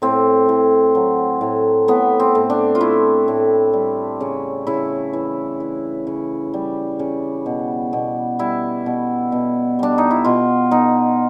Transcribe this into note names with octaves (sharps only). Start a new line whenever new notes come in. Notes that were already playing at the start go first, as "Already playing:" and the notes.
A2 C4
A2
F#3
A2
A2 B3
C4
A2
D4
F4
A3 E4
A2
G3
C#3
C#3 E4
E3
E3
C#3
G3
C#3
B2
B2
G3 E4
B2
B2
G3 D4
D#4
E4
B2 F4
B2 D#4